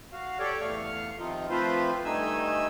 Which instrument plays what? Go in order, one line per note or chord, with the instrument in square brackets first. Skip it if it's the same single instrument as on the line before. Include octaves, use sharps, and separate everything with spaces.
[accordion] F#4 F5
G4 A4 C#5 D5
E2 A3 F5 C#6 F6
C3 D#3 F3 D#4 F4
F3 A3 C4 F4 B4 C5
G2 D#3 A3 D#4 G#5 E6